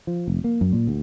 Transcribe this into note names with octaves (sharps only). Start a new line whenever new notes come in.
F3
F1
A#3
F#2
A#2
D2